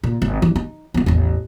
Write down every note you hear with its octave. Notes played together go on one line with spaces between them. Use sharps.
A#2
G#1
E3
D#4
C#2 B3
A1 E2